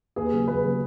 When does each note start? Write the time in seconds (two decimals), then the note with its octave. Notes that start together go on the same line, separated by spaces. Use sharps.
0.16 D#2 G#4 B4
0.33 C#3 F#3 B3
0.48 D#2 G#4 B4
0.63 C#3 F#3 B3